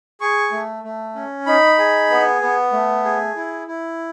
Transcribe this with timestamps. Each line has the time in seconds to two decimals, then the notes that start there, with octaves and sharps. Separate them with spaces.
0.21 G#4 C#6
0.51 A3
0.83 A3
1.15 C#4
1.46 D#4 B5
1.78 G#4
2.10 B3
2.41 B3
2.72 A3
3.04 G#4
3.36 E4
3.67 E4